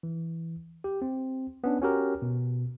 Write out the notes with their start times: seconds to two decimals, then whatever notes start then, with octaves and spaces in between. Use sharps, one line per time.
0.03 E3
0.84 G4
1.02 C4
1.64 B3 C#4 D4
1.82 C#4 F#4 G4 A#4
2.22 B2